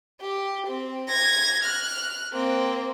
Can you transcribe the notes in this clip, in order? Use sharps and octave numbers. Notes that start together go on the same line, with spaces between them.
G4
C4
G#6 A#6
F6 F#6
A#3 C4